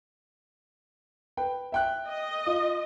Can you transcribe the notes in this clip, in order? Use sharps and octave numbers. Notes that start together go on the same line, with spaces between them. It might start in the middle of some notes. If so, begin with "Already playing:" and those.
B4 G5
E5 G5 F#6
D#5
F4